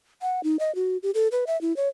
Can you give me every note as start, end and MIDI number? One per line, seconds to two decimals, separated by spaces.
0.22 0.43 78
0.44 0.57 63
0.59 0.74 75
0.75 0.97 66
1.03 1.11 67
1.15 1.28 69
1.32 1.44 71
1.47 1.59 76
1.61 1.75 64
1.77 1.88 73